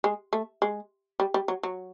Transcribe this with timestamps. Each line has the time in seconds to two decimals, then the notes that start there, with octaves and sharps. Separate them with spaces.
0.04 G#3
0.33 A3
0.62 G#3
1.20 G3
1.34 G3
1.48 F#3
1.63 F#3